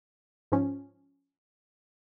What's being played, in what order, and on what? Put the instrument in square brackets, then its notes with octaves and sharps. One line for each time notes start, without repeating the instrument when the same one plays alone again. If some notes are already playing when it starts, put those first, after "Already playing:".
[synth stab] G#2 F3 C#4